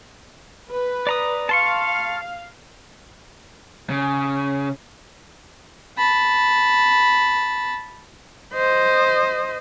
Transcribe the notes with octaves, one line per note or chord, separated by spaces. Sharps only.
B4
D5 A#5 D#6
F5 A5 C6 C#6
C#3
A5 B5
C5 D#5